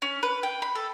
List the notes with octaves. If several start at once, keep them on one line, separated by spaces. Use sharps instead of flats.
C#4
B4
G5
B5
A4